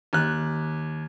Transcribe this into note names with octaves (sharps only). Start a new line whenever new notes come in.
D#2 F#6